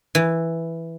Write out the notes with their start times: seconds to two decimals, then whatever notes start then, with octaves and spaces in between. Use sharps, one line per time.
0.15 E3